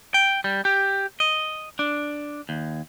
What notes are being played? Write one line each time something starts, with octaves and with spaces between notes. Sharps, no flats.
G5
G3
G4
D#5
D4
D#2